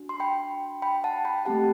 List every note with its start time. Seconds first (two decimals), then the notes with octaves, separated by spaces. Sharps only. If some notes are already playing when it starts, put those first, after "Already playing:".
Already playing: D4 F#4
0.09 C6
0.20 G5 B5
0.82 G5 B5
1.04 F#5 A5
1.25 G5 B5
1.45 A3 C4 G4 F#5 A5